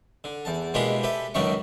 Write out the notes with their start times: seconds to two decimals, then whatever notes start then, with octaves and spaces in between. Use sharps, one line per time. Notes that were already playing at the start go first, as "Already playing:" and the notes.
0.24 D3
0.45 E2 A5
0.74 B2 G#3 A#3 D4 E4 G4
1.03 G4 A4 B4 E5
1.34 C#2 F#2 D#3 D4 E5 C#6